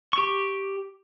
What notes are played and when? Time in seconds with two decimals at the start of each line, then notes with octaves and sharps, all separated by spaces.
0.13 G4 C#6